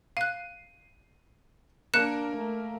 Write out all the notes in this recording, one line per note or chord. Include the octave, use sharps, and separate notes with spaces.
F5 F#6 C7 D#7
A#3 D4 A#4 F#6 C#7 E7
A3